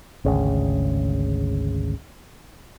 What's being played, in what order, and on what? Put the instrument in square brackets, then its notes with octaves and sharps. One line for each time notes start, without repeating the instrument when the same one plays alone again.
[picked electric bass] G#1 D2 C#3